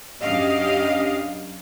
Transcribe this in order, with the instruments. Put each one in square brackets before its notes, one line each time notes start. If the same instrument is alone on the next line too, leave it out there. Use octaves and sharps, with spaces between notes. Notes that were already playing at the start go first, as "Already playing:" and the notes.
[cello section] F#2 C#4 D4 G4 D#5 F5